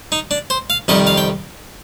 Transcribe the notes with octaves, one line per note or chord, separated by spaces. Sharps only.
D#4
D4
C5
F5
F2 C3 D#3 G3 D#5
F5
G5